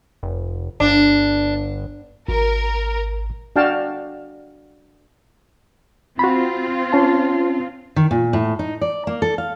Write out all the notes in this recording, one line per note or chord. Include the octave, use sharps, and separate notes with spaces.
F1
G1 D4
G#1 A#4
D4 F#4 F5 G5 A5
C4 F4 F#4 B5
C#4 A5
D#3
A#2
A2
D#4
D5
A#3
A4
F5